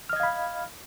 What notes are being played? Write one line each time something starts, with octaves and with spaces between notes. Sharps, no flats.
D#5 F5 B5 F6 G#6